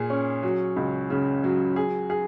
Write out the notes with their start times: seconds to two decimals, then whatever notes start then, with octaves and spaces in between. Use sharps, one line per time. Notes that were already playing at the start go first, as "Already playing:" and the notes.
Already playing: A#2 G#4
0.10 C#4
0.43 F#3
0.76 C#2
1.10 C#3
1.44 F#3
1.76 G#4
2.10 G#4